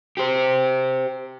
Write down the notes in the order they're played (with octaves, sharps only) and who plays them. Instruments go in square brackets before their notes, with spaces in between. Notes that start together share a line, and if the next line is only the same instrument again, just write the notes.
[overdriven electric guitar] G4 C5